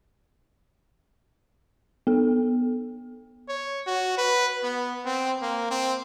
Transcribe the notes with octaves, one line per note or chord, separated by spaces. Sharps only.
B3 A4
C#5
F#4
B4
B3
C4
A#3
C4